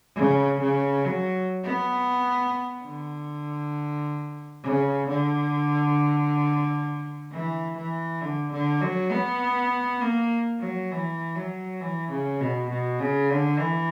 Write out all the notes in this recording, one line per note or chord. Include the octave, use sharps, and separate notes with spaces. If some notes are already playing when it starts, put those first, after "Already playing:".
C#3
C#3
F#3
B3
D3
C#3
D3
E3
E3
D3
D3
F#3
B3
A#3
F#3
E3
F#3
E3
C#3
B2
B2
C#3
D3
E3